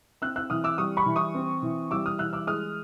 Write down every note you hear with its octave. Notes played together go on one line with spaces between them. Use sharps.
C4 E6 F#6
E6 F#6
E3 D#6 F6
D6 E6
G3 C#6 D#6
B5 C#6
E3
C#6 D#6
C4
E3
G3 D6 E6
D#6 F6
E3 E6 F#6
D6 E6
G#3 D#6 F6